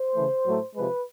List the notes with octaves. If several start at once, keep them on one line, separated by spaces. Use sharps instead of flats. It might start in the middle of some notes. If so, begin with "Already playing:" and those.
Already playing: C5
C#3 E3 A3
A2 F#3 A3
C3 F3 G#3 B4